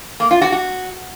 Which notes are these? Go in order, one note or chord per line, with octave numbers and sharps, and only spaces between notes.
A#3
F4
F#4
F#4